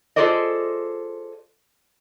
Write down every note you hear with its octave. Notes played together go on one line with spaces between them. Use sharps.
F4 G#4 A4 C5 D5 D#5